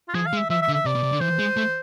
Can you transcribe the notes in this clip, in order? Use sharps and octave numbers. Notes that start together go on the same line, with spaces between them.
F4
F3 G#4
F5
G#3
E5
F3 E5
E5
D3
E5
C3 D5
B2
C3
D3
E3 C5
G#3
A3